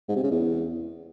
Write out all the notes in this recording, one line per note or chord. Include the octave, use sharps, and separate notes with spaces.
G#2
C3
C#3
E2